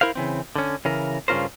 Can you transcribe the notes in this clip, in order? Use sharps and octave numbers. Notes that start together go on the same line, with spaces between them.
E4 A#4 C5 F5
C#3 E3 C4
D3 C#4
C#3 E3 A#4
G2 C#3 C#4 F4 A#4 C5